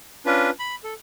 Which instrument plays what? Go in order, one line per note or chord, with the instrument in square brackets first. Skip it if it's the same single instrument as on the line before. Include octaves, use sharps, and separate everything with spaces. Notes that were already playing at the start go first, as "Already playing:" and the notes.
[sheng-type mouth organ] C#4 D4 F4 B4
B5
A4